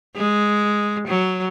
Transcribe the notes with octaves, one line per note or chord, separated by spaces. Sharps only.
G#3
F#3